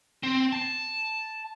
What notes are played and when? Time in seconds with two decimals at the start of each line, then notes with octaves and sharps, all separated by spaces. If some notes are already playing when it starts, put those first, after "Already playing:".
0.23 C4
0.52 A5